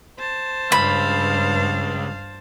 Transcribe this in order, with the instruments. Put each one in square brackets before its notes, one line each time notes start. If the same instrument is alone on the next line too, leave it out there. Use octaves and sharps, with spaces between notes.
[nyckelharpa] C5 A5
[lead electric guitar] C#2 [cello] G2 F5 [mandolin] B5